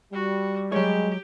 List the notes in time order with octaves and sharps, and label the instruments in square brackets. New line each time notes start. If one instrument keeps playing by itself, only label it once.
[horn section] G3 [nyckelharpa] F#4
[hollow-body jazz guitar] F#3 C#5 [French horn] G#3 [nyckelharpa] G4